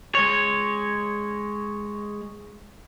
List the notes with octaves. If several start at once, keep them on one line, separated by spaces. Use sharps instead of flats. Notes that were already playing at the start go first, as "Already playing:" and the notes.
G#3 C#5